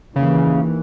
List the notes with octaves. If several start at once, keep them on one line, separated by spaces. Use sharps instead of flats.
D#2 C#3 E3